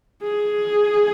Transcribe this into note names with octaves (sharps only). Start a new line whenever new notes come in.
G#4